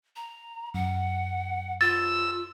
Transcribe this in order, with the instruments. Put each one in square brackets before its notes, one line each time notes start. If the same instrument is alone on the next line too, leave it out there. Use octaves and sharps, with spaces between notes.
[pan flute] A#5
[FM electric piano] F#2 [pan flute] F#5
[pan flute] F4 [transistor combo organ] E6 [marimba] A6